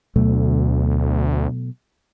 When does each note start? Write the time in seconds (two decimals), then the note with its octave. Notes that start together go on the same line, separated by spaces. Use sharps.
0.16 D2 B2 F#3 A3